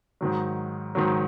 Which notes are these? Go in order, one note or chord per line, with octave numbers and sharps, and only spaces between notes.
G#2 D#3 F#3
G#2 D#3 F#3